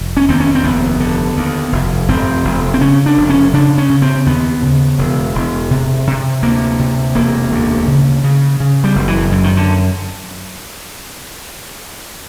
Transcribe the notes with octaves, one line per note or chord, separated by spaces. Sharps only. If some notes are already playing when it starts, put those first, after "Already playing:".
Already playing: F1
C#4
D#2 C4
C#4
C4
F1 B3
D3
D#2
F1
F1 C4
F1
C4
C#3 C#4
D4
F1
C#4
C#3 D4
C#4
C#3
C4
D#2 B3
C#3
E1
E1
C3
C3
D2 A#3
C3
E1 A#3
D2
C#3
C#3
C#3
G3
F#1
E3
F#2
D#3
D3